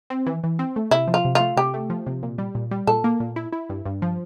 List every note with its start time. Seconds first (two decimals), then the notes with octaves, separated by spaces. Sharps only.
0.10 C4
0.26 E3
0.44 E3
0.59 C4
0.76 A3
0.91 C3 E4
1.08 F3
1.14 F4
1.25 C3
1.35 F4
1.40 A3
1.57 C3 G4
1.74 A3
1.90 F3
2.07 C3
2.23 A#2
2.38 G3
2.55 A#2
2.71 G3
2.87 A#2 A4
3.04 A#3
3.20 A#2
3.36 E4
3.52 E4
3.70 G2
3.85 G2
4.02 F3